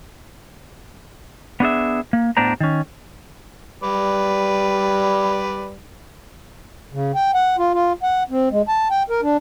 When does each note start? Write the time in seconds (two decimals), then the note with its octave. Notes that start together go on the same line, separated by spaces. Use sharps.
1.60 B3 D4 G#4 E5
2.13 A#3
2.37 A2 B3 D4 C5 A#5
2.60 D#3 C#4
3.83 G3 B4 D5
6.93 C#3
7.14 G5
7.34 F#5
7.58 F4
7.74 F4
8.02 F#5
8.30 C4
8.51 G#3
8.68 A5
8.90 G5
9.10 A#4
9.22 D4